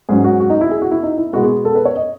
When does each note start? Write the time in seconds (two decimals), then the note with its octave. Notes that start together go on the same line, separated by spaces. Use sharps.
0.09 G#2 F#3 C#4 G#4
0.24 F#4
0.40 F#4
0.50 D#4
0.61 E4
0.71 G#4
0.82 F#4
0.92 E4
1.03 D#4
1.18 E4
1.33 B2 G#3 B3 F#4
1.43 G#4
1.65 A4
1.75 B4
1.85 C#5
1.96 D#5